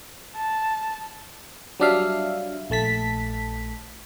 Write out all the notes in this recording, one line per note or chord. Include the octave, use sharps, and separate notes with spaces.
A5
F#3 G3 D4 E5 F5
A#1 A3 A5 B6